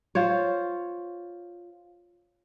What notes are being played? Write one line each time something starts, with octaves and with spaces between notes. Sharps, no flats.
F4 C5 C#5